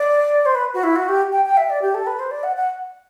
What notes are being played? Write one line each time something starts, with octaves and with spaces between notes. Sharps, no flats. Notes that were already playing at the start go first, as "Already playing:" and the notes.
Already playing: D5
C5
B4
F#4
E4
F#4
G4
G5
G5
E5
D5
G4
A4
B4
C5
D5
F#5
F#5